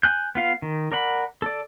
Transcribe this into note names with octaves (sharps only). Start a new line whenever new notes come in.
G#5 F#6 G6
B3 F4 F5
D#3
A#4 D5 F#5 B5
A4 D5